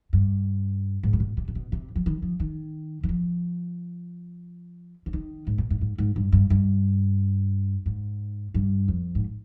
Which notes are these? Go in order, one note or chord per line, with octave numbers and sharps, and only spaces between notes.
G2
G#2
C3
B2
C3
C3
B2
C3
F3
D#3
F3
D#3
D#3
F3
D3
D#3
G#2
B2
G#2
G#2
G#2
G2
G2
G2
G#2
G2
F2
G#2